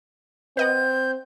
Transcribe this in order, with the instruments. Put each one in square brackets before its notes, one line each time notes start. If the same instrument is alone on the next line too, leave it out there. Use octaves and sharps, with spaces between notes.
[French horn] C4 [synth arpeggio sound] B4 D#5 F#5 [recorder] G6